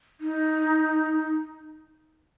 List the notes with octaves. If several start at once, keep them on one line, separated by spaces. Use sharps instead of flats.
D#4